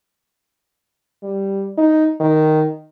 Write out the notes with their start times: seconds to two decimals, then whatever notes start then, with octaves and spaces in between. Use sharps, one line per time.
1.23 G3
1.78 D#4
2.20 D#3